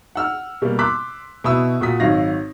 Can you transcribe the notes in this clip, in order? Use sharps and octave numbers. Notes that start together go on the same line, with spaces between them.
F#5 E6 F6
B2 G3 A#3
C6 D6 E6 F#6 B6
B2 E4 B5 D#6 E6
A#2 F#4 D#6 B6
G#1 F#3 F5 A#6